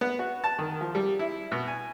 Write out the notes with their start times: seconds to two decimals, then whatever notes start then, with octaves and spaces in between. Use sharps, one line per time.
0.01 B3
0.19 F#4
0.44 A5
0.59 D#3
0.81 F3
0.95 G3
1.19 E4
1.52 B2
1.67 G#5